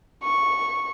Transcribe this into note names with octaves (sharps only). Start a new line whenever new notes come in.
C#6